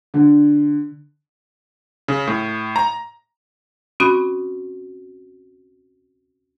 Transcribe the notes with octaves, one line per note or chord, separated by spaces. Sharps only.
D3
C#3
A2
A#5
C4 C#4 F#4 B5 D#6